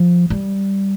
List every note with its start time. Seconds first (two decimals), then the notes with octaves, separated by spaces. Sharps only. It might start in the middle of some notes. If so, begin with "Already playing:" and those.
Already playing: F3
0.30 G3